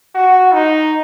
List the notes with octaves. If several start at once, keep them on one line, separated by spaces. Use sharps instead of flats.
F#4
D#4